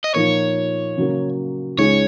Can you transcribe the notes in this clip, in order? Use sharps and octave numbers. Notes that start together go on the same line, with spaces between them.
D#5
A#2 F3 A#3 D#4 C#5
C#3 F#3 A#3
C#2 C#3 G#3 D#4 G#4 C#5